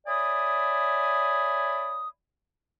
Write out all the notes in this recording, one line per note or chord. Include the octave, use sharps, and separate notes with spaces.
C#5 D5 E5 G#5 B5 D#6